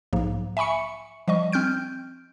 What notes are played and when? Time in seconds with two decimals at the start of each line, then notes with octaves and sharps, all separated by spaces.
0.13 B1 G#2 F3 A#3
0.57 E5 G#5 B5 C#6 C#7
1.28 F3 G3 D#5 C#6
1.52 C4 F6 G6 D7